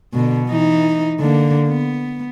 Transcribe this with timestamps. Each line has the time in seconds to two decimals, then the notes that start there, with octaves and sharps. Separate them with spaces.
0.13 B2 D3
0.46 E3 D#4
1.20 D3 A#3
1.68 B3